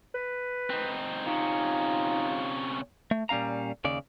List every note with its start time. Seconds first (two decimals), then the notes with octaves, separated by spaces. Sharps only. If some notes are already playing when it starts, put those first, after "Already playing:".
0.14 B4
0.70 C4 D#4
1.26 C3 C#4 D#4 F4
3.11 A3
3.29 A#2 G3 C#4 F5 A#5
3.84 D#2 C#3 D5